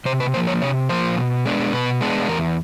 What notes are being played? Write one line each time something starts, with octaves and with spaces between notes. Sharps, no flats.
C3 C5
B4
F3 A#3 C5
C#5
C3 C#5
F3 A#3 C5
B2
G#3 B3 D4
B2 B4
G#3 B3 D4
E2 A#4